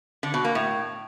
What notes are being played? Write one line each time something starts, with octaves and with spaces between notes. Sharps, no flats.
D3
B2
A#3
A2